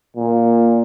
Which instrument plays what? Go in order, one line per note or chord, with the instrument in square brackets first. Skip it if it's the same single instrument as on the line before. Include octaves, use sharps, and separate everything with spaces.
[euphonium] A#2